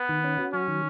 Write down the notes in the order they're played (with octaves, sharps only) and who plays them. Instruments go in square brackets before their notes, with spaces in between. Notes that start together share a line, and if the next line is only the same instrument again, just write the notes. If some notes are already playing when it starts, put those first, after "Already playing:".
Already playing: [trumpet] B3
[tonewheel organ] D#3
C#4
F#4
[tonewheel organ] F#3 [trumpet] C#4
[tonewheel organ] D#3